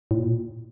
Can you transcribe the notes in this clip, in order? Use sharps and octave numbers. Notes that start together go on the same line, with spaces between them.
A2
A#2